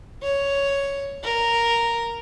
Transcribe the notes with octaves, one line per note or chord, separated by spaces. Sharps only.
C#5
A#4